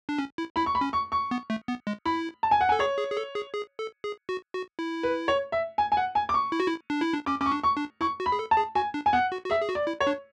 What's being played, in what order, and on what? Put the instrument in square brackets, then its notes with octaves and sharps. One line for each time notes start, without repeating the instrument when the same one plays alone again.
[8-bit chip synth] D4
C#4
E4
[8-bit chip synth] E4 [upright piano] B5
[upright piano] C#6
B5
[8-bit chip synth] C#4
[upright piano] C#6
C#6
[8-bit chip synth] B3
A3
B3
G#3
[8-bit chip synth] E4 [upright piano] B5
[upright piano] A5
G#5
F#5
G#5
[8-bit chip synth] A4
[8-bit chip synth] G#4 [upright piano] C#5
[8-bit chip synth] G#4
G#4
A4
G#4
G#4
A4
G#4
F#4
F#4
E4
[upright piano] B4
C#5
E5
G#5
G#5
F#5
G#5
D6
C#6
[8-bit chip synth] E4
F#4
E4
D4
E4
D4
[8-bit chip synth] C#4 [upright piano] D6
[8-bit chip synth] C#4 [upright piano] D6
[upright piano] C#6
[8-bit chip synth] D4
[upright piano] C#6
[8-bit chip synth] D4
[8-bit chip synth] E4 [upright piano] C#6
[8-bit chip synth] F#4
[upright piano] B5
[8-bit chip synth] G#4
A4
[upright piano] A5
[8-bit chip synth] G#4
[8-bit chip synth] F#4 [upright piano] G#5
[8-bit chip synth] D4
[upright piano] G#5
[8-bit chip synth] B3 [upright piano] F#5
[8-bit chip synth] F#4
F#4
[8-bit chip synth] G#4 [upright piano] E5
[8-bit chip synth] G#4
F#4
[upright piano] D5
[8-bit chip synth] E4
[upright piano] C#5
[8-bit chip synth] D4